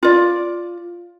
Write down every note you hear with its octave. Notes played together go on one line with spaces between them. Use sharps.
F4 D5